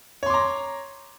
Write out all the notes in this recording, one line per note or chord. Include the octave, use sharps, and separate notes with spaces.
C#5 A#5 C6 D6